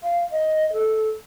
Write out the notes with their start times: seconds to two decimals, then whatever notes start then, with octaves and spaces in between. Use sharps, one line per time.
0.03 F5
0.31 D#5
0.73 A4